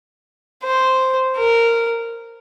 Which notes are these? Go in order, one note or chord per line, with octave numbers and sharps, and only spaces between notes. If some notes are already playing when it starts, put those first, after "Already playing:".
C5
A#4